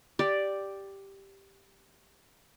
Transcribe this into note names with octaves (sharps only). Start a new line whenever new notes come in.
G4 D5